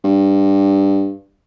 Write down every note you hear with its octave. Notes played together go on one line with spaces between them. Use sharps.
G2